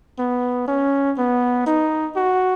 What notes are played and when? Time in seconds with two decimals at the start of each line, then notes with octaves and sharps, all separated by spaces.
0.19 B3
0.68 C#4
1.18 B3
1.66 D#4
2.16 F#4